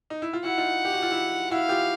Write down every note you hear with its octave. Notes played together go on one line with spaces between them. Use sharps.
D#4
E4
F4
E4 F#4 F#5
D#4 F4
G4
F#4
F4
E4 F#4
E4 F#4 F5
F4 G4